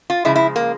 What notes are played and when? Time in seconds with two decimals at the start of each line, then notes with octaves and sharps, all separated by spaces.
0.10 F4
0.25 C#3 F3 G#3 E4
0.36 E4
0.56 A#3